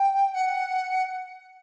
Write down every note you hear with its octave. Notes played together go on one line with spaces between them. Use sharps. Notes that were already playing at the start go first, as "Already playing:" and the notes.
Already playing: G5
G5
F#5